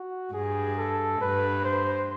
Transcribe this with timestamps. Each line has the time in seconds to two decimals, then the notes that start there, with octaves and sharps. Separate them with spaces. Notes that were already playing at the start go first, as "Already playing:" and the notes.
Already playing: F#4
0.33 G2 G#4
0.78 A4
1.21 G2 B4
1.65 C5